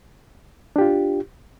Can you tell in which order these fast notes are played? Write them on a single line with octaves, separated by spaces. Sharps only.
D4 G4 F4